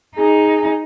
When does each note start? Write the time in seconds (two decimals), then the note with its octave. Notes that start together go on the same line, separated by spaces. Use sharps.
0.16 D#4 G#4